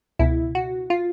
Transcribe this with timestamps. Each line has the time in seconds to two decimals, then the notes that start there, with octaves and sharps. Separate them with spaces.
0.19 C#2 B2 E4
0.55 F#4
0.90 F4